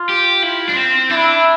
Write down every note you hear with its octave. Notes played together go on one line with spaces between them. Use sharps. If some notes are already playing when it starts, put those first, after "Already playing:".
Already playing: F4
G4
E4
D4
C4
D4 E4